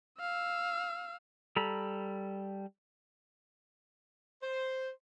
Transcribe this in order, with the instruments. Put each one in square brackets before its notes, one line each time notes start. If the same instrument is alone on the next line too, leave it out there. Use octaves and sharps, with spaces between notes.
[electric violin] F5 E6
[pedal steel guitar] G3 A4 A#5 B5
[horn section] C5